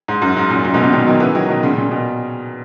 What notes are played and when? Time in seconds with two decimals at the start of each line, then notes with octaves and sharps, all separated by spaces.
0.08 G#2
0.22 F#2
0.36 G#2
0.50 F#2 A#2
0.64 F#2 A#2
0.74 G#2 B2
0.83 A#2 C#3
0.92 B2 D#3
1.07 D#3 F#3
1.20 C#3 E3
1.35 D#3 F#3
1.49 B2 D#3
1.63 A#2 C#3
1.77 A#2 C#3
1.91 B2